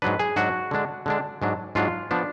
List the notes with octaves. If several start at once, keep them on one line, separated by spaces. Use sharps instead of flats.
G#2 F#3 D4 B4
G#4
G#2 F#3 D4 F#4
D3 G#3 D4
D3 G#3 D4
G#2 F#3 D4
G#2 F#3 D4 F4
F3 B3 D4